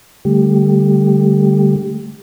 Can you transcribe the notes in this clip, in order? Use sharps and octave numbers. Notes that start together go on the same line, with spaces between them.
D3 G3 A3 G4